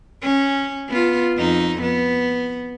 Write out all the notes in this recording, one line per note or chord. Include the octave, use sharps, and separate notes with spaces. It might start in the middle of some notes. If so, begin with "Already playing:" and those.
C#4
B3 F4
F2 D#4
B3